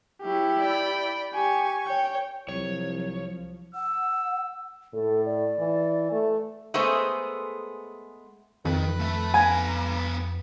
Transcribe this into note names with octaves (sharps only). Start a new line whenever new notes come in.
F#3 E4 G4
D5 G5 B5
G4 G#5 C#6
C#5 G5
C2 F3 F#3 C#5
F#5 E6
A2 A4
D5
E3
A3
G#3 A3 B3 G#4 C5
F2 D#3 B4 B5
A3 E5
B3 G#5 A#5